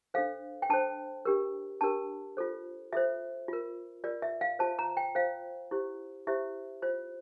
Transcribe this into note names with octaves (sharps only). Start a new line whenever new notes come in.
D4 A4 C5 F5
G5
D4 A4 C5 A5
D4 G4 A#4
D4 G4 A#4 A5
F4 A4 C5
F4 A4 C5 E5
F4 A#4
F4 A#4 D5
E5
F5
F4 C5 A5
A#5
G5
F4 C5 F5
E4 G4 C5
E4 G4 C5 E5
F4 C5